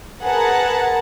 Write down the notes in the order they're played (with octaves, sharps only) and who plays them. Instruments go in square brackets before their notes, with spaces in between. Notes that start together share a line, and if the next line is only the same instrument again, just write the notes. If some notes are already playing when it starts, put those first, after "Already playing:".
[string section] G#4 A#4 B4 F#5 A5 A#5